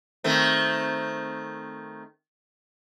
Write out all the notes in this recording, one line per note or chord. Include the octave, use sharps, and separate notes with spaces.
D#3 A3 C4